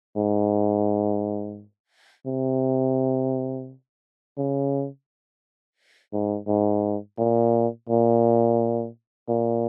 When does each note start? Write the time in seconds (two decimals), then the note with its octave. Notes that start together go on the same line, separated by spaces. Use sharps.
0.17 G#2
2.26 C3
4.38 C#3
6.13 G#2
6.48 G#2
7.18 A#2
7.89 A#2
9.29 A#2